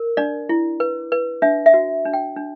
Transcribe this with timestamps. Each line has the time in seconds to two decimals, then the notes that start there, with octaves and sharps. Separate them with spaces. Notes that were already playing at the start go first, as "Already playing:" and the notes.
Already playing: A#4
0.17 D4 D5
0.49 E4
0.80 B4
1.12 B4
1.42 D4 E5
1.66 E5
1.74 F#4
2.06 D4
2.13 G5
2.36 D4